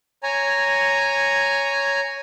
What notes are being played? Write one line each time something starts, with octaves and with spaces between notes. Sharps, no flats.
C#5 G#5 A#5